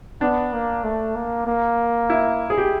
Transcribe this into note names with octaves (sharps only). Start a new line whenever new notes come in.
B3 D4
A#3
A3
A#3
A#3
E4
G#4
G4